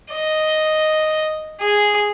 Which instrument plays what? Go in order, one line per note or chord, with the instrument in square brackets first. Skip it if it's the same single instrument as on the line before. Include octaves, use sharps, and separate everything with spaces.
[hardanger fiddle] D#5
G#4